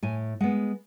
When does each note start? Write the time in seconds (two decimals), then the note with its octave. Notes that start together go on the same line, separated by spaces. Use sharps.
0.03 A2 G#5
0.40 G#3 B3 F#5